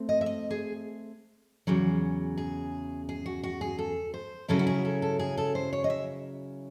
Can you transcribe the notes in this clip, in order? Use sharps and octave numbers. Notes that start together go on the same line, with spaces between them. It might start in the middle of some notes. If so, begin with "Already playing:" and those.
Already playing: A3 C4
D#5
E5
D#5
G#4
E2 C#3 F#3
G#4
G#4
F#4
F#4
G#4
A4
C5
C#3 F#3 C#4 E4 A4
F#4
G#4
A4
A4
G#4
A4
C5
C#5
D#5
E5